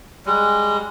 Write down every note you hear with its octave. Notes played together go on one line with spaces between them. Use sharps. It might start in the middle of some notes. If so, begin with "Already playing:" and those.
G3 G#3